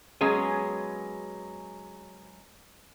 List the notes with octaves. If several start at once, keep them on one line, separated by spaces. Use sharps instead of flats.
F#3 G#3 B3 C#4 G#4